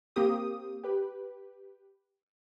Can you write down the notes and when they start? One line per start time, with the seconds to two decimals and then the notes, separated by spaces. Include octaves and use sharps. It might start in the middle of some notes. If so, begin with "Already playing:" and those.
0.16 A#3 C4 G4 D#6
0.84 G4 B4